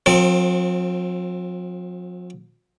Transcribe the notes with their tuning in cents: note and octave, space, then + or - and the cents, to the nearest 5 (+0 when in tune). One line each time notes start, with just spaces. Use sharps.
F3 +45 C4 +15 A#4 -40